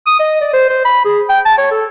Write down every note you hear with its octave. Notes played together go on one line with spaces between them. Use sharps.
D#6
D#5
D5
C5
C5
B5
G#4
G5
A5
C#5
A4